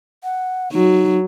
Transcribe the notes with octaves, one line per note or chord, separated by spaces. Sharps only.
F#5
F#3 D#4